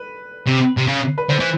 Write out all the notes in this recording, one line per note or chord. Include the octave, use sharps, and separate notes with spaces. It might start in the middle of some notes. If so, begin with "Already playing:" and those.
Already playing: B4
C3
C3
C#3
B4
D3 C5
E3